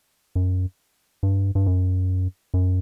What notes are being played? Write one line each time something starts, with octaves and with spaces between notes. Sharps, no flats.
F#2
G2
G2
F#2
F#2